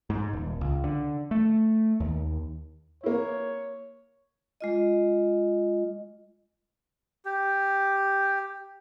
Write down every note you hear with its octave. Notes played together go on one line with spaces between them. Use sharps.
G#2
D#1
C#2
D3
A3
D#2
A#3 E4 C#5
G#3 F4 D#5
G4